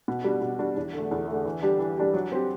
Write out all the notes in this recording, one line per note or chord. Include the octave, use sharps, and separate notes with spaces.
B2
G3 D4 F#4
B2
G3 D4 F#4
E2
D3 A3
E2
D3 A3
E3
G3 D4 G4
E3
G3 D4 G4
F#3
C4 G4